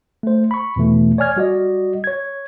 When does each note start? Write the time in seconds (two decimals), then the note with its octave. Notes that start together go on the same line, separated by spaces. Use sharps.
0.23 A3 C5
0.51 B5 C#6
0.76 E2 B2 E3 A3
1.18 C#5 D5 G#5 F6 G#6
1.36 G3 F#4 D5 D#5
2.04 C#5 G#6